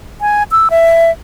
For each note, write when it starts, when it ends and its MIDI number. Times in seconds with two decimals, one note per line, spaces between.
0.21 0.43 80
0.51 0.68 88
0.70 1.11 76